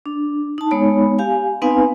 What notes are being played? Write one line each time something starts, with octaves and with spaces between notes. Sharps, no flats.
D4
D#4 A5
G#3 B3 D#4 C#5 B5
G4 F5 G#5
B3 C4 D#4 B4 F5 G#5